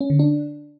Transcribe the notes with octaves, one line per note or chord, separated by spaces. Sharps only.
C#4
D3
D4